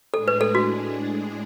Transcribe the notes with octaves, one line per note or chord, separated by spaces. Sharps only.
A2 G#3 D4 G#4 A4
B4
A4
F#4